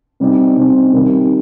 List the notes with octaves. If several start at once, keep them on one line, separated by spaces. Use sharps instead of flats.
C3 G3 C4 D#4
C3 G3 C4 D#4
C3 D#3 G3